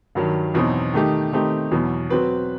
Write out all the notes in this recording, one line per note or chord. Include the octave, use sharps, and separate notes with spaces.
G2 D#3 F#3
E2 B2 F#3 C4 D#4
D#3 A3 D#4 G4
D#3 A3 C4 D#4 G4
E2 B2 F#3
F#3 C4 F#4 B4